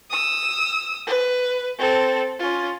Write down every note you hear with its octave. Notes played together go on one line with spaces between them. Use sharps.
D#6 E6
B4
C4 A4
C#4 F4